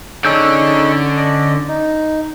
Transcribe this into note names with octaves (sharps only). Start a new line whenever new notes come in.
D3 C#4 D#4 G#4 C#5 E6 G6
D5 D#5
D#4